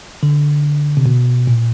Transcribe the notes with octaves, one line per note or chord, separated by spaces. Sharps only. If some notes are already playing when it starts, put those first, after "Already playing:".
D3
C3
B2
A#2